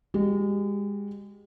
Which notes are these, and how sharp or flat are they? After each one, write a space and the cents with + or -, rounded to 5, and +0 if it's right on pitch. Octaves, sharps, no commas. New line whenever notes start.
G#3 -35 G4 -40